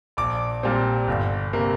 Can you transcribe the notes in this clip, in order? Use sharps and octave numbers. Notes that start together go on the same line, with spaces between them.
A#1 D6
A#2 G3 C4
G1
C3 A#3